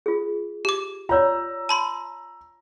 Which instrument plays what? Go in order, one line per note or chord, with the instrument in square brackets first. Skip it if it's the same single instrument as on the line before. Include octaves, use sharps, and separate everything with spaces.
[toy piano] F4 G#4
[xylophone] G4 D6
[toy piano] F4 C#5 D5 [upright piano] A#5 E6
[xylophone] A5 B5 C6